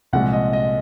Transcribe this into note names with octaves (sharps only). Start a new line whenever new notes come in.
C2 A#2 F3 G#3 F#5
D#5
D#5